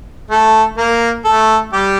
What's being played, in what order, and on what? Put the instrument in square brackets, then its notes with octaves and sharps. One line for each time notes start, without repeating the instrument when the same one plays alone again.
[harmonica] A3 A4
A#3 A#4
A3 A4
G3 G4